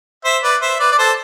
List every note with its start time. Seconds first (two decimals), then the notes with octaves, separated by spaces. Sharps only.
0.24 C5 E5
0.43 B4 D5
0.62 C5 E5
0.80 B4 D5
0.92 D5
0.99 A4 C5